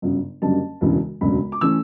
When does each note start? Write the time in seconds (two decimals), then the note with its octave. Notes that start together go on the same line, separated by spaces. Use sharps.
0.02 G1 F#2 C#3 F#3
0.42 F#1 F#2 D3 G3 A5
0.81 E1 D2 C#3 E3 B3
1.21 E1 D2 C#3 F#3 B5
1.52 D6
1.61 E3 A3 C#4 E6